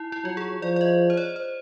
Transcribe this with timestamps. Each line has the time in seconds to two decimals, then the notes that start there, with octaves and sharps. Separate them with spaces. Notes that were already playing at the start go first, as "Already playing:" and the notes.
Already playing: D#4 E4
0.12 E4
0.25 F#3 F4
0.37 G#4
0.62 F3 D5
0.76 D5
0.81 D#5
1.10 C5
1.17 C#5
1.36 C5